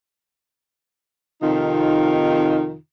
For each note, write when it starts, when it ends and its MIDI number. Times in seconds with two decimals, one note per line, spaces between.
1.42 2.74 41
1.42 2.74 48
1.42 2.74 51
1.42 2.74 63
1.42 2.74 65